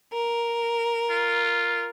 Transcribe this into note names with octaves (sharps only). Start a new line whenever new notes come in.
A#4
F4